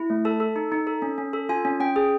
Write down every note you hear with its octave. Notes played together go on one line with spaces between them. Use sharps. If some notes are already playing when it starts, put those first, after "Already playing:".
Already playing: E4
A3
A4 A5
A4
D#4
D#4
A4
C#4
C#4
A4
F4 G#5
C#4
C#4 G5
G#4